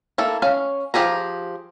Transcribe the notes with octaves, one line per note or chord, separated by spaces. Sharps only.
A#3 E4 A4
C#4 F5
F3 G4 G#4 A#5